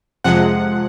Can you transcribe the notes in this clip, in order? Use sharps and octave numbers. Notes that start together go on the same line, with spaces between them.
F2 C3 F3 G#3 F#5